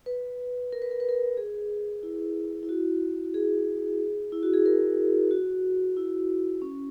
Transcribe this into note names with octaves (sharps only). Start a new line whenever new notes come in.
B4
A#4
B4
A#4
B4
A#4
G#4
E4
E4
F#4
G#4
E4
F#4
G#4
A#4
F#4
E4
C#4